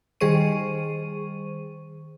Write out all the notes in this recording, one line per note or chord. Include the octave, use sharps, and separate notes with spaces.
D#3 G3 G#4 C5 C#6 D#7